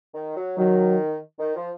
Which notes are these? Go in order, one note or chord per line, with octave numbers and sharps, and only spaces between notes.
D#3
F#3
D#3 F#3
D#3
F3